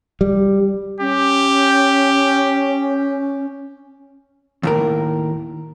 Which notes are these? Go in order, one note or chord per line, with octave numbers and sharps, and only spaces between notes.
G3
C#4 G4
D#2 A2 A#4